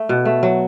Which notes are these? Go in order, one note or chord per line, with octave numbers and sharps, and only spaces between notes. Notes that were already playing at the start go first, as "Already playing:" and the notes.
Already playing: A3
B2
A3
F#3